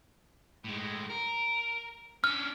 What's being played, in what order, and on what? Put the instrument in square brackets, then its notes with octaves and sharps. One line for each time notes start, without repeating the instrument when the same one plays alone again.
[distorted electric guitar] A2 G#3
A#4
[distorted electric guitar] C#4 D4 [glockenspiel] F6